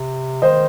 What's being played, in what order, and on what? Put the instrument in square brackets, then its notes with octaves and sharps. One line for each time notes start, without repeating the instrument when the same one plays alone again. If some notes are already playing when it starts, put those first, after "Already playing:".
Already playing: [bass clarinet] C3
[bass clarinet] D#3 [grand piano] C5 D#5